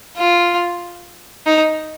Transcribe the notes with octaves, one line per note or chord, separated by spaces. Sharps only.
F4
D#4